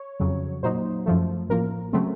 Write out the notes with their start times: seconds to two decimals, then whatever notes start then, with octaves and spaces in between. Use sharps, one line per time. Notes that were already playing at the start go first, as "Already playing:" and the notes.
Already playing: C#5
0.20 F2 C#3 F#3
0.63 A#2 F#3 A#3 D#4 C5
1.06 F#2 F3 A3
1.49 A1 A2 F3 A#3 A#4
1.93 C#3 F#3 A3 C4